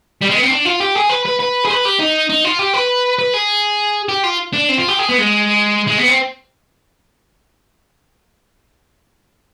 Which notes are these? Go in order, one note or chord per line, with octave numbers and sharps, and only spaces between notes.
G3
G#3
B3
C4
D4
F4
G4
G#4
B4
B4
B4
G#4
B4
G4
D#4
D#4
F4
G4
B4
B4
G#4
G4
F4
D4
C4
F4
G4
G#4
B3
G#3
G#3
B3
C4